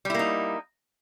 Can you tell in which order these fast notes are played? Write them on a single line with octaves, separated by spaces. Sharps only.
G3 E4 A#3 D#4